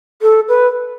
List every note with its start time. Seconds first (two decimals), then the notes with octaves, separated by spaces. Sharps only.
0.22 A4
0.48 B4